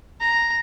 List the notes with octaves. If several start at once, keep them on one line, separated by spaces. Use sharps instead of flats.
A#5